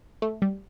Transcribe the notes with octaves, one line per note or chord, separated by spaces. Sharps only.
A3
G3